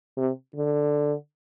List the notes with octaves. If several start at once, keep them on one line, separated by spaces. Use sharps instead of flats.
C3
D3